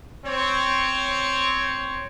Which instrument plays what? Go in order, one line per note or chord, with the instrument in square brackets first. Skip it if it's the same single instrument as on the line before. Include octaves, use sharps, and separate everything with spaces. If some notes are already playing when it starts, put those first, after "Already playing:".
[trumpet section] C4 C#5